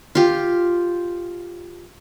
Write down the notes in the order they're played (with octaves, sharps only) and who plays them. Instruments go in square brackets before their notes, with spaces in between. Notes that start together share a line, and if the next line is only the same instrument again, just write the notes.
[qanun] F4 G4